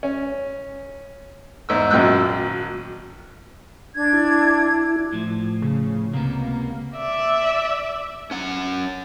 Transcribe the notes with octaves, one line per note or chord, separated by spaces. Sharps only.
C#4
E2 G#2 E6
G#1 F#2 A#2 G5 E6 F#6
D4 G#6
E4
A2 F3
C#3
C#2 C3 A#3 B3
D5 E5
C#4 F#5